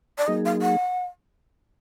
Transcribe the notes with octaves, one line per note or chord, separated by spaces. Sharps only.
D5
F#3 A#3 D#4 G#4 D#5
F5
F#5